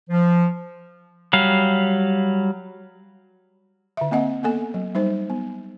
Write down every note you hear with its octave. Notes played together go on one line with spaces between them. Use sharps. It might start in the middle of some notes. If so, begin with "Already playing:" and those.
F3
F#3 G3 F5
D3 E5
A#3 C4 D#5 F#5
A#3 B3 A4 G#5
F#3
G3 D#4 C5
B3